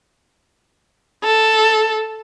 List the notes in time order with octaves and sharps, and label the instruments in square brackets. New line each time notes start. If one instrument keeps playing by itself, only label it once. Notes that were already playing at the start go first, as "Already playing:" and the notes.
[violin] A4